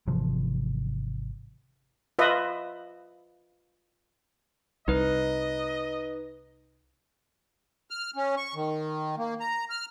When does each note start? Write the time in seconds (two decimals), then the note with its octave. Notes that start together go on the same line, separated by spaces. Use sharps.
0.07 G#1 C3 E3 F3
2.19 F4 B4 D#5 E5
4.88 C2 D#4 B4 D#5
7.90 F6
8.16 C#4
8.37 C#6
8.55 D#3
9.18 A#3
9.40 A#5
9.70 F6